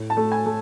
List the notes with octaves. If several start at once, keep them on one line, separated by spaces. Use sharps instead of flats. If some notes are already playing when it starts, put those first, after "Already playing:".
Already playing: A2
A5
A3
G#5
A3